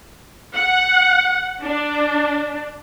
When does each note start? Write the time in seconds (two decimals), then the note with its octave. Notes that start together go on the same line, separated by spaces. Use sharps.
0.53 F#5
1.62 D4